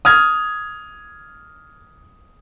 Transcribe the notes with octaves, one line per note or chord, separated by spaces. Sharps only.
D#6 F6 G#6